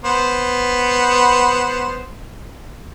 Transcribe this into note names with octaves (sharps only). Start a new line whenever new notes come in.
B3 C5